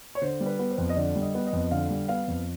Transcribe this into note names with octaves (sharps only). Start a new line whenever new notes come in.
C#5
D3 C5
G3
B4
B3
C5
F2
D#5
D3 D5
G3
D#5
B3
D#5
F2
D3 F5
G3
B3 F5
F2